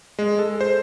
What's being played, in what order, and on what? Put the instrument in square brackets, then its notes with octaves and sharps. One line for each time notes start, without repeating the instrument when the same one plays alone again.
[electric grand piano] G#3
A4
C5